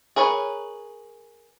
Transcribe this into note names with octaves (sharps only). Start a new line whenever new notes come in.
G#4 A#4 B4 C#5